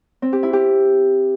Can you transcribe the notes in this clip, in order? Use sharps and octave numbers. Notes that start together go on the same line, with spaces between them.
C4
G4
E4
G4